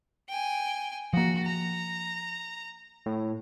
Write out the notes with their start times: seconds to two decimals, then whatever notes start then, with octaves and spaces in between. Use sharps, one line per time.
0.28 G5 G#5
1.13 F3 A#3 F#4
1.43 A#5
3.06 A2